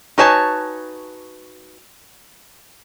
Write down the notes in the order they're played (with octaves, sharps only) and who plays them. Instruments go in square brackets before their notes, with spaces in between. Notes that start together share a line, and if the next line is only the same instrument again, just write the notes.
[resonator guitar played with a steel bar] D#4 F#4 B4 C#5 G#5 A5